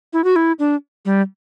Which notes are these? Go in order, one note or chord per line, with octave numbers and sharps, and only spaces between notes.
E4
F#4
E4
D4
G3